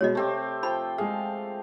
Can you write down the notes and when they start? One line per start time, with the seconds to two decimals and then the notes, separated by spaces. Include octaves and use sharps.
0.01 B2 G#3 C#5 D#5
0.15 C3 A3 C4 G4
0.63 F3 G5 B5
0.98 G#3 G#4 F5